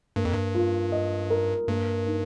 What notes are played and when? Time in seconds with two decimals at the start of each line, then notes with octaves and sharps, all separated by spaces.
0.16 G2 A#3
0.25 F2
0.33 G2
0.55 F4
0.92 D#5
1.30 A#4
1.67 G2 A#3
2.06 D#4